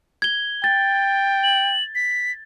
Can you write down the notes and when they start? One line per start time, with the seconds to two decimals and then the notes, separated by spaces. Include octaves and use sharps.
0.22 G#6 G7
0.64 G5 A6
1.43 F#7
1.95 B6